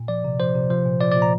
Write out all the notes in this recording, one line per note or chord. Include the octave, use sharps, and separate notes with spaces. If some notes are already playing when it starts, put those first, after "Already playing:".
Already playing: A#2
F3 D5
C3
F3 C5
C3
F3 C5
A#2
F3 D5
A#2 D5
A#5